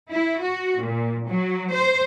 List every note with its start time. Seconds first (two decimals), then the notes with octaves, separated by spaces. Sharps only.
0.10 E4
0.42 F#4
0.80 A#2
1.28 F#3
1.71 C5